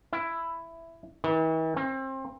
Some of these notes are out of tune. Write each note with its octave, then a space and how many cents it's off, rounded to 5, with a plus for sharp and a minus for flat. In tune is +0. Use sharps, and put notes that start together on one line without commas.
E4 +10
E3 -45
C4 +30